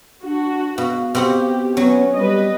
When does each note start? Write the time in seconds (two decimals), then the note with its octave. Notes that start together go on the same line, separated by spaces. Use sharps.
0.24 D4 F#4
0.78 B2 F5
1.15 B2 C4 G4 F#5
1.77 F#3 B3 C#4
2.16 G3 B4 D#5